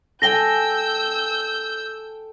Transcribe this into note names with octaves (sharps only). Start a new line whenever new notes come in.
A4 G5 G#5 E6 G6 A#6 G7